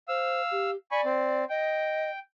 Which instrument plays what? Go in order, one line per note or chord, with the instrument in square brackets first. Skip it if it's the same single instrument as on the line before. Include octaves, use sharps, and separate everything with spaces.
[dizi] C5 [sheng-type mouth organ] F5 E6
[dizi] G4
[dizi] D5 [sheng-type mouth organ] G#5 B5 C#6
[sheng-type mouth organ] C4
[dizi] D#5 [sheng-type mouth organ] G5